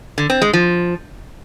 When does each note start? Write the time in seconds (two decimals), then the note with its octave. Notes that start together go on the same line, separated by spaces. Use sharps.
0.18 D3
0.30 C4
0.42 G#3
0.53 F3